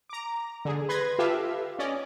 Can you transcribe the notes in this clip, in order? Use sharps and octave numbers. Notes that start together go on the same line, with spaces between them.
A#5 D6
D3 G#4
B4 C6 G#6 A#6
F4 G4 A4 B4 E5 F5
C#4 D5 D#5